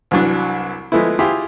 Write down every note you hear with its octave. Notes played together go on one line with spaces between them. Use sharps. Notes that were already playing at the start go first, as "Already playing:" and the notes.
C2 E3 F#3 D4
F3 G#3 A3 B3 E4
E4 F4 G4 G#4 F5